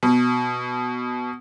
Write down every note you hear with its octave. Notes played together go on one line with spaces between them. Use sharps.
B2